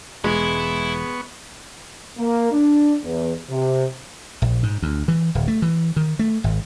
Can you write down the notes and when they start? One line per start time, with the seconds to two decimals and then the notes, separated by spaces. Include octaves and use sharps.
0.24 E1 G#3 B3 E4 C#6
2.18 A#3
2.52 D4
3.03 E2
3.49 C3
4.42 A#1
4.63 G#2
4.82 D2
5.08 E3
5.35 D1
5.48 A3
5.62 E3
5.96 D#3
6.19 A3
6.44 G#1